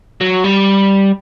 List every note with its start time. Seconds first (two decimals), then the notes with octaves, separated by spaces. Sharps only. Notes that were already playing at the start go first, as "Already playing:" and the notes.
0.21 F#3
0.44 G3